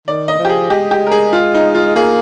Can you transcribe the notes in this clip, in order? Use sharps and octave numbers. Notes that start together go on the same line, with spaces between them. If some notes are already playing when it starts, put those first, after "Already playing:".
D#3 D5
D#5
F3
G4
G#4
G#3 G4
G4
A#4
G#4
F4
D#4
F4
A#3 G#4